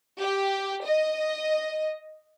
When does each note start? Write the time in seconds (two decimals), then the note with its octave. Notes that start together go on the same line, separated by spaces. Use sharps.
0.19 G4
0.85 D#5